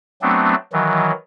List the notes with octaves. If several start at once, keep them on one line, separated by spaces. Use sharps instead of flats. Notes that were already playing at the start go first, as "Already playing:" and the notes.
F#3 A3 B3 C4 D4
D#3 E3 F#3